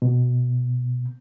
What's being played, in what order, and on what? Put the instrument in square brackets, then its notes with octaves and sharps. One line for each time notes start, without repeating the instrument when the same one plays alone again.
[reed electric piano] B2